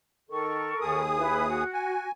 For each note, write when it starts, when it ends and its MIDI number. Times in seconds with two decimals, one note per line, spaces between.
0.30 0.74 51
0.30 1.02 69
0.30 1.02 70
0.30 1.02 85
0.81 1.64 39
0.81 1.64 68
0.81 1.64 87
1.17 1.47 64
1.17 1.47 71
1.48 2.05 66
1.73 2.12 80